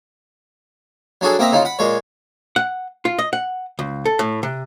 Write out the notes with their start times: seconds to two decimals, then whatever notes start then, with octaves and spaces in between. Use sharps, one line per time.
1.21 F#3 D4 F#4 G#4 A4
1.39 A#3 C4 D#5 E5 A#5
1.52 C#3 D#4 F4
1.65 F#5 B5
1.79 A#2 G#3 C#5
2.56 F#5
3.05 F4
3.19 D#5
3.33 F#5
3.79 C#2
4.05 A4
4.19 A2
4.43 C3